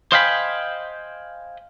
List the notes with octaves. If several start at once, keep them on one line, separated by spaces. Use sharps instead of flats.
C5 D#5 F5 G5 G#5 B5